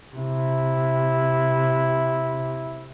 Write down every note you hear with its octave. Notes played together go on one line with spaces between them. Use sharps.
C3 E4